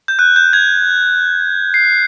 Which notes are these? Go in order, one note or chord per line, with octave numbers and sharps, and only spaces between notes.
G6
F#6
G6
G#6
C7